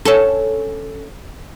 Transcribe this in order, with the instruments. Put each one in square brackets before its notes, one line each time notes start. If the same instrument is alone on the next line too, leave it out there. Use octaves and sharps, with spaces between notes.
[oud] C#4 A4